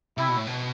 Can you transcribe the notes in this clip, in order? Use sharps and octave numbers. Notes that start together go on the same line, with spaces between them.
C3 E4
B2
A2
B2